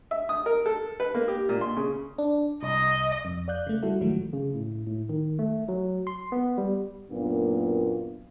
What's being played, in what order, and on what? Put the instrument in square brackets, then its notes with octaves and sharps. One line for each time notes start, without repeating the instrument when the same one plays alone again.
[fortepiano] E5
D#6
A#4
A4
B4
A#3
G4
A#2
C6
C#3
[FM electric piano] D4
[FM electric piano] C2 [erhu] D#5
[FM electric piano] F2
D5 F5 F#6 G6
C#3 A3
D3 G3 E4 F#4 A4
D2 G#2 D#3 F3 F#3 A3
[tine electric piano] C#3
A2
A2
D#3
A3
F#3
C6
B3
G3
[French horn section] F#2 A#2 A#3 B3 D4